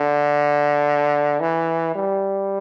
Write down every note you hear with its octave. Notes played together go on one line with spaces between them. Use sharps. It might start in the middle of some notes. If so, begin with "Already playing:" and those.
Already playing: D3
E3
G3